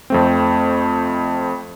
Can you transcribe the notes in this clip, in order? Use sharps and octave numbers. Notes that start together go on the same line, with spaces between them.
F2 A3 C4